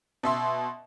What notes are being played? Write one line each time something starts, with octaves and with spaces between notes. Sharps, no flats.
B2 E5 C6